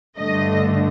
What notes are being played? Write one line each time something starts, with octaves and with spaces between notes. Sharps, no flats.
G2 D3 A3 D#5